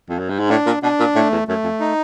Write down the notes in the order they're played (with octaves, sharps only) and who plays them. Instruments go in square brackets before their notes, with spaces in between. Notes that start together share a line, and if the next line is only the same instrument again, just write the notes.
[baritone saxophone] F2
F#2
G2
G#2
[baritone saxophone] A2 [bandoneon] D4
[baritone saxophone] A#2
[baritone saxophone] B2 [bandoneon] D4
[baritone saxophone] A#2
[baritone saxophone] A2 [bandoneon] A3
[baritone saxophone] E2
[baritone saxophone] F#2 [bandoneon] A3
[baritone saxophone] F2
[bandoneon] D#4